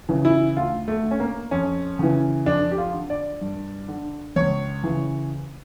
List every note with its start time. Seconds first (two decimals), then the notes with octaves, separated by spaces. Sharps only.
0.09 C#3 E3
0.25 E4
0.56 D2 F4
0.88 A3
1.04 D3
1.11 C#4
1.20 A#3
1.51 F2 C#4
1.99 C#3 E3
2.46 F2 D4
2.72 G4
2.78 F4
2.94 D3
3.10 D5
3.41 G2
3.88 D3
4.36 C#2 C#5
4.83 C#3 E3